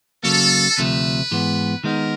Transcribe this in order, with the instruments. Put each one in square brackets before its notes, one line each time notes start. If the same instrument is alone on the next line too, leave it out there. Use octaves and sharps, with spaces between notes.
[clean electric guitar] C#3 F#3 A#3 [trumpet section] A4
[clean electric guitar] D2 C3 F3 A3 [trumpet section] B4
[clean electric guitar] G#2 E3 G#3 B3
[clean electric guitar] D#3 G#3 B3 D#4 [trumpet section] A#4